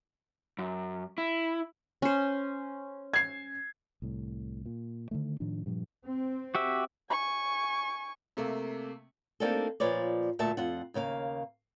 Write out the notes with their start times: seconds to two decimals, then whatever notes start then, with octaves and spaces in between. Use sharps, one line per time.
0.59 F#2
1.18 E4
2.02 C#4 C5
3.14 G#6 C7
4.02 C2 A2
4.66 A#2
5.11 D3 D#3 A3
5.40 A2 D#3 F3 D4
5.66 G2 A#2 F3 G3
6.06 C4
6.55 F#4 G4 E5
7.10 G#5 C#6
8.37 C3 A3 A#3
9.40 A#3 C4 D4 D#4 F#4 A4
9.80 A#2 F3 B4 C#5 D5
10.39 D2 A#2 A3 E5 A5
10.57 F2 F4 F#5
10.94 D#2 C#3 A#3 F5